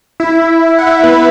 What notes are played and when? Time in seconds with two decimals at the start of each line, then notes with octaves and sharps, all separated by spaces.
0.20 E4 E5
0.79 F#5
0.87 E4 E5
1.04 B3 B4